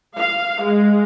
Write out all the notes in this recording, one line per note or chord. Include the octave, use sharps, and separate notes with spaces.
F5
G#3